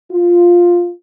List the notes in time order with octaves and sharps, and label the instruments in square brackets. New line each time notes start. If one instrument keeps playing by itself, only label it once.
[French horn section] F4